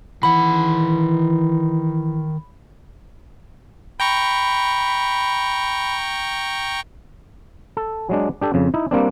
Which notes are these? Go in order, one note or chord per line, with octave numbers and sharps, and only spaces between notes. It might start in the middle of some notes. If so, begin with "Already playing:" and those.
D#3 E3 F#5 B5
G5 A#5 B5 C#6
A4
F#3 G#3 D4
D4 G4 A4
F2 C#3
D#4 E4
G3 A#3 C4 D4